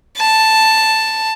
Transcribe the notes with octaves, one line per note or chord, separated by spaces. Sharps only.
A5